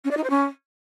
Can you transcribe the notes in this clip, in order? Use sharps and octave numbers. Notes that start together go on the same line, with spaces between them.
C#4
D5
D#4
C5
C#4